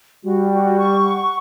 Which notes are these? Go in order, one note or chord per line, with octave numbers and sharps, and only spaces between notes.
G3 F#4
F#4
C#6
F#5